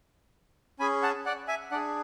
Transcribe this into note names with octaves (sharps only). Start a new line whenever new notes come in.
C#4 G#4 G#5 B5
F#5 A5
D5 F#5
E5 G#5
D4 G#4 D5 F#5